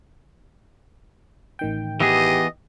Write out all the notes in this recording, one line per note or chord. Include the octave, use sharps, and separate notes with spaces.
A1 D#3 G5
E3 B3 G4 G#4 D#5